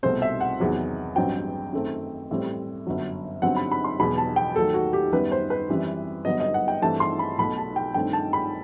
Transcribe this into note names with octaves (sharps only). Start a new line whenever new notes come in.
C2 B2 A3 C4 C5
E5
F#5
E2 C3 D#3 F#3
A1 G2 F#3 C4 G5
F#2 D#3 A3 C4
A1 A2 G3 C4
G1 F#2 F#3
G1 G2 F#3 C4 F#5
B5
B5
C6
E1 E2 B2 F#3 B5
A5
G5
D#2 D#3 F#3 A3 A4
F#4
G4
F#2 D#3 G3 B3 B4
C5
B4
F#2 E3 G3 C4
G1 G2 F#3 B3 D#5
D#5
F#5
G5
G2 E3 A3 C4 A5
C6
B5
B1 B2 A3 B5
A5
G5
G2 D#3 A3 C4 G5
A5
B5